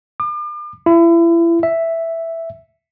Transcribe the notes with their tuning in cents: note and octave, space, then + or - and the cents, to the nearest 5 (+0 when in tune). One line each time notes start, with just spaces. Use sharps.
D6 +40
E4 +35
E5 +0